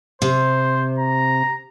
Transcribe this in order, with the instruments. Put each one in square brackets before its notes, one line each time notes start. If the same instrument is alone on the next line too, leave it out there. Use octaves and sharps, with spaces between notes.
[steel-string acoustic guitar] C3 [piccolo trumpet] C5
[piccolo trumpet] A#5